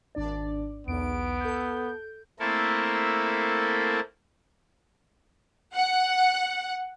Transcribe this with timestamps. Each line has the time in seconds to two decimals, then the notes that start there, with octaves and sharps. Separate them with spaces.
0.15 G#1 D4 D5
0.87 B1 E2 B3 D7
1.41 A4 G6
2.40 A3 A#3 C4 E4 A4 A#4
5.73 F#5